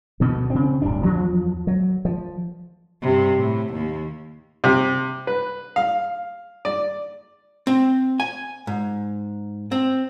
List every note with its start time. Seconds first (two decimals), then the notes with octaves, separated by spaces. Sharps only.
0.20 D2 B2 B3
0.50 C#3 C4
0.82 D1 G2 D4
1.03 E2 F3 F#3
1.67 F#3
2.05 F3
3.02 G2 C3
3.35 A2
3.73 D#2 A#3
4.64 C3
5.27 B4
5.76 F5
6.65 D5
7.67 C4
8.20 G#5
8.67 G#2
9.72 C4